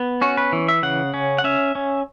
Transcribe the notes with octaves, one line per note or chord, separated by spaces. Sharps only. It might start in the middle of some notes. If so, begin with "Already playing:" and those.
Already playing: B3
C#4 F#4
B4
E3
E5
C#3 F#5
C#4
F#5
C#4 E5
C#4